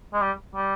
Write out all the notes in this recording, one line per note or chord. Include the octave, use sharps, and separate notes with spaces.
G#3
G3
G3